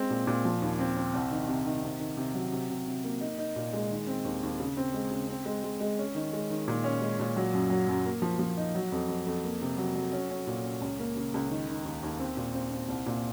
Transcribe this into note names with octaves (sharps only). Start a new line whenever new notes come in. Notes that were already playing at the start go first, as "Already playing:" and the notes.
Already playing: G#3 C4
A#2
A#2
F3
D#2
C4
C4
C2
D#3
C3
D#3
C3
D#3
C3
F#3
C3
C3
C3
A#3
D#4
D#4
A#2
G#3
D#3
C4
D#2
D#2
C#3
C4
G#3
C#3
C4
G#3
G#3
G#3
C#4
D#3
G#3
D#3
A#2
C#4
G#3
A#2
F#3
F#2
F#3
F#2
A#3
F3
F3
D#4
F#3
F2
F2
F2
A#3
C3
F#3
F#3
C#4
C#4
A#2
C#4
C#2
A#3
C#3
C#2
D#3
D#3
D#2
D#2
C4
A#2
C4
C4
C2
A#2